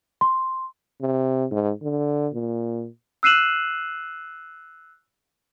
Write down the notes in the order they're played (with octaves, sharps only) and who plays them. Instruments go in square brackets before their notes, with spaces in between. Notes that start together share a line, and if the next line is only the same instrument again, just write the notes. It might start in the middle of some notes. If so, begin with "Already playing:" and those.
[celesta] C6
[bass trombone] C3
G#2
D3
A#2
[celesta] E6 F#6 C7 D#7 E7 F#7